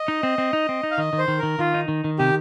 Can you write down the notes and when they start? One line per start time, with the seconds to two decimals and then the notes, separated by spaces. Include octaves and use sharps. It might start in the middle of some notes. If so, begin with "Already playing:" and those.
Already playing: D#5
0.08 D#4
0.23 C4
0.38 C4
0.53 D#4
0.69 C4
0.83 D#4
0.91 F5
0.98 D#3 D#5
1.13 D#3
1.18 C5
1.28 D#3
1.39 D#3 A#4
1.59 D#3 F4
1.74 D#4
1.88 D#3
2.04 D#3
2.19 C3 G4